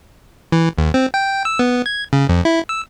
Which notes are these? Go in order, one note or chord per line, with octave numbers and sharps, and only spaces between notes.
E3
D#2
C4
G5
E6
B3
G#6
C#3
F2
E4
E6